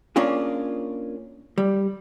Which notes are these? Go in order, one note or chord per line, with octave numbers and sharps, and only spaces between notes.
A#3 C#4 D4 F4 G#4
G3